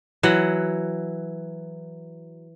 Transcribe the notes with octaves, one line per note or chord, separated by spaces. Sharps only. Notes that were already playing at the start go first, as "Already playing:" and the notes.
E3 F#3 F#5